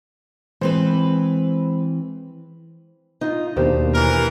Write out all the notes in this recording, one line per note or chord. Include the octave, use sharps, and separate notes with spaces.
E3 G#3 C4 B4 C5
D#4 F4
D#2 B2 A#3 D4 G4 C5
E3 A#4